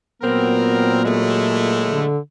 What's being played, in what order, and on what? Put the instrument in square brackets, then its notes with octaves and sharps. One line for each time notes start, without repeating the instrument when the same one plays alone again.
[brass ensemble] A#2 F#3 [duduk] B3 [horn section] C4 A#4
[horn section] E3 G#3 A3
[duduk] D3